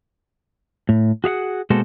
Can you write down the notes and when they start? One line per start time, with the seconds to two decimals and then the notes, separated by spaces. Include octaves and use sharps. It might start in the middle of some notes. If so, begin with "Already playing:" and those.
0.89 A2
1.24 F#4 G#4 F5 F#5
1.70 B2 G#3 A#3 F#4 A4 C5